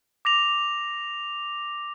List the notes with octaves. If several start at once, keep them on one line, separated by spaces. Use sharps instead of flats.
D6 A#6 F7